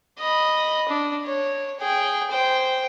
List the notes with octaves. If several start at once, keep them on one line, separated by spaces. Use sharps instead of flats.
D#5 B5
D4
C#5
G#4 G5
C5 G5